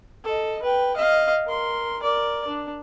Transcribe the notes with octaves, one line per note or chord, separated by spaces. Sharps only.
A4 D#5
B4 G5
D#5 F5
A#4 C6
A#4 D5
D4